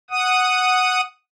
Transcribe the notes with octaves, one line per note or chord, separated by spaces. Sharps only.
F#5 D#6